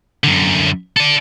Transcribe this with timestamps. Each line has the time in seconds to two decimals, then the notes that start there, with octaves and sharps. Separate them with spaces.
0.24 F#2 D3
0.97 A4 D5